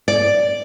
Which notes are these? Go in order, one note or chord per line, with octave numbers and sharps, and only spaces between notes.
D5